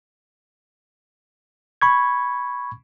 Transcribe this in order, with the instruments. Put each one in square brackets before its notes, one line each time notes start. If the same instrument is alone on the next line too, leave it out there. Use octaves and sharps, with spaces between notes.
[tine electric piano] B5 C#6 G#6